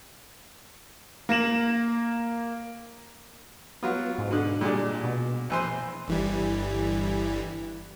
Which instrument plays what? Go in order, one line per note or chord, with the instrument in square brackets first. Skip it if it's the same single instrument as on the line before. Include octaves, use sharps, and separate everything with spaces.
[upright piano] A#3 A#6 E7 F#7
[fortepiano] F#3 F4 [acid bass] B3
[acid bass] G#2
[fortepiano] B2 D3
[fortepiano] A#2 G#3 D4 [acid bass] G3
[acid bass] B2
[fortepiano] A#1 E3 C5
[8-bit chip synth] G1 E3 G3